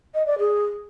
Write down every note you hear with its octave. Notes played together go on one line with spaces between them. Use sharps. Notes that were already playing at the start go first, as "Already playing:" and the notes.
D#5
D5
G#4